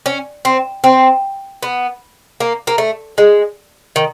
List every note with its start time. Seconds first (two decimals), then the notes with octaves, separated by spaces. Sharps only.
0.06 C#4
0.45 C4
0.84 C4
1.63 B3
2.40 A#3
2.67 A#3
2.78 A3
3.18 G#3
3.96 D#3